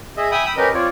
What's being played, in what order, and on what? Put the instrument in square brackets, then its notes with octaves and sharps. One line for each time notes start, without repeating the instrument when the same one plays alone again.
[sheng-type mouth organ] G#4 D#5 E5
E5 G5 G#5 B5 D#6
G5 B5 D#6 E6
C#4 G4 A#4 B4 D#5
C4 F4 C#5 D5